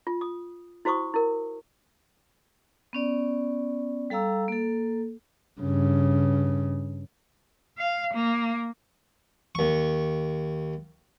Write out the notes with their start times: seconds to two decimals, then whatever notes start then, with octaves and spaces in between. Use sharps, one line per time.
0.07 F4
0.21 D#6
0.85 E4 F#4 C5 C#6 D#6
1.14 E4 A#4
2.93 B3 C#4 D5
4.10 G3 A4 F5 A#5 E6
4.48 A#3 A4
5.61 G2 C#3
7.78 F5
8.14 A#3
9.55 D#2 C#6